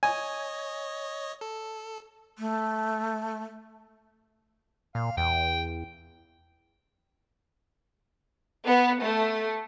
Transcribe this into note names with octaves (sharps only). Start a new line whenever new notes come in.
C#5 D#5 G#5
A4
A3
A#2 F5
E2 G5
B3
A3